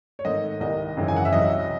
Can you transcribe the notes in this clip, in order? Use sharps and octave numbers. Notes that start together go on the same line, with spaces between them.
C#5
G#2 D#3 A3 C4 D#5
C2 C3 D#3 D#5
G#1 F#2 C#3 E3 G#3
G#5
F#5
E5
C2 C3 F#3 C#4 D#5